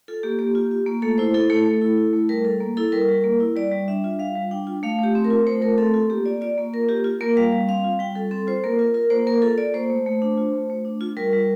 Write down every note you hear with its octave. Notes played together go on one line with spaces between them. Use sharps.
F4 A4
A#3 G4
A#3 G4
F4
F4
A#3
A3 A4
E4 C5
E4 A4
A3 A4
A3
E4
E4
A3
G3 A#4
G3 A4
A#3
E4 A4
G3 A#4
G3
A#3
E4
G3 D5
G3
D4 E5
F4
G3 F5
G3
D4 G5
F4
A3 F5
A3 G4
C4
A#4
F4
A3 C5
A3 A#4
C4 A4
F4 A4
A#3 G4
F4 D5
F4 D5
A#3
A#3 A#4
F4 G4
F4
A#3 A#4
G3 F5
G3
C4 F5
F4
G3 G5
G3 A4
C4 A4
F4 C5
A#3 A#4
F4 A#4
F4 A#4
A#3 C5
A#3 A#4
F4 A4
F4 D5
A#3 C5
A3
A3
D4
F4
A3
A3
D4
F4
G3 A#4
G3